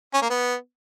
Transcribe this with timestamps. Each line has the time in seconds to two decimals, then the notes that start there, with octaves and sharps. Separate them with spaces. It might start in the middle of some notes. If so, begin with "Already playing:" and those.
0.14 C#4
0.22 A#3
0.30 B3